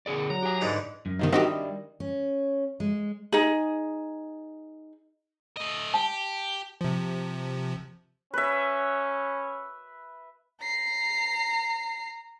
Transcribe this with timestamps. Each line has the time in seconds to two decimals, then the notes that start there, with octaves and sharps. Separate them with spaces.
0.06 D3 G#4 D5
0.30 F#3 A#5
0.43 G4 G#5
0.61 G#2 D3 E3
1.06 F#2
1.19 G2 C3 D#3 B3 D#4
1.32 D#3 G3 C4 D4 E4 F#4 G4 D#5
2.00 C#4
2.80 G#3
3.32 D#4 G#4
5.57 A3 D#5
5.94 G4 A5
6.81 C3 F3
8.34 C#4 B4 E5
10.60 A#5 C7